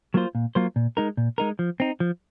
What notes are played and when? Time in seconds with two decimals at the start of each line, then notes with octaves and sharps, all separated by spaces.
0.14 F#3 A#3 F4 C5
0.35 A#2
0.55 F#3 A#3 F4 C5
0.76 A#2
0.97 G#3 D#4 A#4
1.17 A#2
1.38 G#3 D#4 A#4
1.59 F3
1.80 C4 D#4
2.00 F3